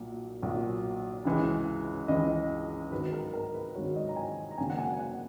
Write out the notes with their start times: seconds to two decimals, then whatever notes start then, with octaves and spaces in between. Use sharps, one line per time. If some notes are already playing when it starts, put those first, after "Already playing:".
Already playing: B1 A#2
0.42 B1 A#2 F#3
1.25 C#2 C#3 E3 G#3
2.08 C#2 C#3 E3 G#3 D#5
2.91 G#1 G#2 D#3 F#3 B4
3.13 A#4
3.34 A#4
3.54 B4
3.75 G#1 G#2 D#3 F#3 C#5
3.96 D#5
4.09 A#5
4.16 G#5
4.51 A#5
4.58 G#1 F#2 C#3 F#3 A#3 G#5
4.70 F#5
4.78 G#5
4.99 F#5